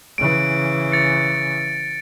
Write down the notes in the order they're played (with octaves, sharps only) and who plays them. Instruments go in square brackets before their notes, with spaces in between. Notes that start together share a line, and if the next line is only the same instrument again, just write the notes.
[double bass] C#3 E3 [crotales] D7
[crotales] A6 C#7